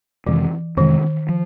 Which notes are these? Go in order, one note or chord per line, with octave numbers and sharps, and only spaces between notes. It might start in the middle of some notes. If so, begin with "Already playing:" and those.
F2 C3 D#3 E3 G#3
F2 C3 D#3 E3 G#3
F3